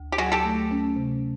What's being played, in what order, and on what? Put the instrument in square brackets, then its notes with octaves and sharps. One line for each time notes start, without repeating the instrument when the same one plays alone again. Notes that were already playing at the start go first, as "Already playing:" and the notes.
Already playing: [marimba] D2
[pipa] G4
[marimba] F#3 [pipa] F#4 G#4
[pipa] G4 A4
[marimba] A3
C#4
C3